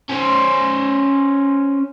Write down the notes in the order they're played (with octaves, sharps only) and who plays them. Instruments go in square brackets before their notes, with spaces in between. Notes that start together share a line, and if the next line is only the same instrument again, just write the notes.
[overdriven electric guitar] C#4 C5